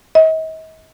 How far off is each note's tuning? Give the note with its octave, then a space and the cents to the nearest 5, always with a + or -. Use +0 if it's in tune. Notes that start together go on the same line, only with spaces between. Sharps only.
D#5 +40